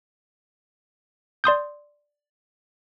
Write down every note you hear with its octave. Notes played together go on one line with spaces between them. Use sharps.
D5 C6 D#6 G6